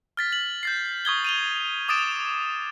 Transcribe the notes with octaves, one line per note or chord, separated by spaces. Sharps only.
F6 A6 B6
F#7
G6 A6 C7
C#6 D#6 G#6 G7
D#7 F7 G7
D6 D#6 A6 D7 E7